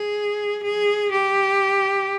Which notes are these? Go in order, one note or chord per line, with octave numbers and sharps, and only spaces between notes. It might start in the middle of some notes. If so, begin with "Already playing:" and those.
Already playing: G#4
G#4
G4